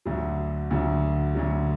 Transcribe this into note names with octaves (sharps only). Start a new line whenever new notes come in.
D2 D3 F#3
D2 D3 F#3
D2 D3 F#3